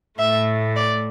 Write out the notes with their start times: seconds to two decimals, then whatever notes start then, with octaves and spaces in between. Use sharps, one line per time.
0.18 A2 A3 E5
0.76 D5